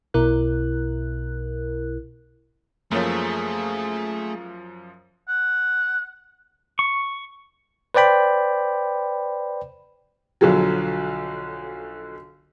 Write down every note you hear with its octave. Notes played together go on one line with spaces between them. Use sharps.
B1 B2 E4 A#4 F#6
F#2 F3 A3 A#3 G#4 C5 C#5
F#5
C#6
B4 C5 D5 G5 B5
B1 D3 F3 F#3